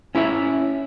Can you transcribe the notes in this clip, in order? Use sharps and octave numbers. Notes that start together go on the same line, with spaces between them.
C#4 E4 C#5 E5